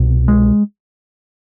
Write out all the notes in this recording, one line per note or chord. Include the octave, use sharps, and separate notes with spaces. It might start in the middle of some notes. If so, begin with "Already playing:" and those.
Already playing: C2 B2
G#3